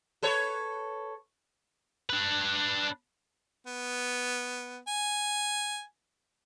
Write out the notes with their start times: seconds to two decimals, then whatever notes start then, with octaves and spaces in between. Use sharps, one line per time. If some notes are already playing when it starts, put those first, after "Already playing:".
0.23 A4 B4 C#5
2.10 D4 B4
3.67 B3
4.88 G#5